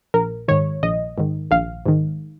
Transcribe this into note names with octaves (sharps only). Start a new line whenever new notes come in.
A#1 A#4
G#2 D#3 C#5
A#1 D#5
G#2 D#3
A#1 F5
G#2 D#3